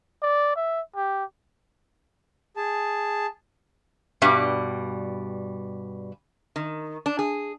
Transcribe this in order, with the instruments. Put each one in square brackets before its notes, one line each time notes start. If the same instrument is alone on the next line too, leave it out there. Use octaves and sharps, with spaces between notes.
[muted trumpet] D5
E5
G4
[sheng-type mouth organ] G#4 A5
[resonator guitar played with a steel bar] G2 B2 G3
D#3
D4
G#4